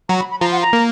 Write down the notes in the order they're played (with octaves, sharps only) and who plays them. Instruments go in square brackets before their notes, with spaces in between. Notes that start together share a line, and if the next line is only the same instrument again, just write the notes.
[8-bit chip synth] F#3 F#4 [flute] A#5
[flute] B5
B5
[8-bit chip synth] F3 F4 [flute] A#5
[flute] F#5
A#5
[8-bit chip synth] A#3